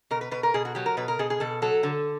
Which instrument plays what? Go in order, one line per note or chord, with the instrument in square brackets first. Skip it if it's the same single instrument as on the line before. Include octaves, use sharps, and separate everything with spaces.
[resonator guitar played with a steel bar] B2 A#4
B4
B2 B4
A#4
B2 G#4
F#4
F#3 G4
A#4
B2 B4
A#4
B2 G#4
G#4
B2 A4
F#3 A4
D3